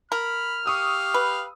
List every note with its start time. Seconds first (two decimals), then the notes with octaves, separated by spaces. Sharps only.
0.12 A#4 B5 F6
0.66 G4 F5 C#6 D#6 E6
1.14 B4